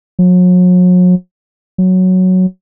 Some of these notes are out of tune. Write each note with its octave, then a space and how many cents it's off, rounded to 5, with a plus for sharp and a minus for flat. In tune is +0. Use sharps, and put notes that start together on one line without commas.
F#3 -40
F#3 +0